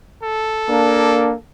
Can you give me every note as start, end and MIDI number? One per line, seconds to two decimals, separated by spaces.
0.23 1.40 69
0.68 1.33 58
0.68 1.33 62